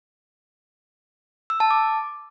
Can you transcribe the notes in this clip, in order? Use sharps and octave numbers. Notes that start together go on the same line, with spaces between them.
E6
A5
D6